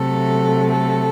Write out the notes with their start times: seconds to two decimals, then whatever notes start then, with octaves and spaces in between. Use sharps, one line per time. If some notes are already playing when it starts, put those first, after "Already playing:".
Already playing: C3 F#3 A3 A4
0.71 A4